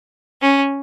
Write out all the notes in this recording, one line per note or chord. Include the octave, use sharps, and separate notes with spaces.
C#4